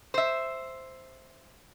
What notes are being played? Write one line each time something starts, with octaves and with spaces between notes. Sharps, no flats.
C5 E5